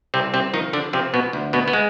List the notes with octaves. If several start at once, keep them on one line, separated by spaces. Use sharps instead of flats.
C2 C3 C4
C3 C4
D#3 F3 D#4
D3 D4
C3 F3 C4
B2 B3
D2
B2 B3
B3
G#3